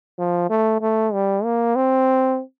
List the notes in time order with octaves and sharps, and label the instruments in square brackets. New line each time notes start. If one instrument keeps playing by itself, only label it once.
[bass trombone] F3
A3
A3
G3
A#3
C4